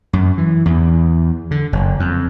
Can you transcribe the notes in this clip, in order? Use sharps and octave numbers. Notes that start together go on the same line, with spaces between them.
F#2
E3
E2
D3
F#1
F2